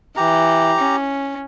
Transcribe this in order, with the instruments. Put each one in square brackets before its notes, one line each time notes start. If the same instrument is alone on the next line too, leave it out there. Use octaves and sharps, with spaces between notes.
[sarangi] E3 [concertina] G4 A#5
[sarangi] C#4